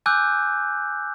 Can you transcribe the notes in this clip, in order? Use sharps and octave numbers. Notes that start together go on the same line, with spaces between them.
G#5 D6 E6 F#6 G6